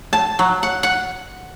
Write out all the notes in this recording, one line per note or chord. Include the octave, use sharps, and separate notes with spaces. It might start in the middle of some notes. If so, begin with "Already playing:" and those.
A5
F#3
F#5
F#5